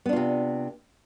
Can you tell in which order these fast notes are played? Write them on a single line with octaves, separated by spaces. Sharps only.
B3 D4 F4 C3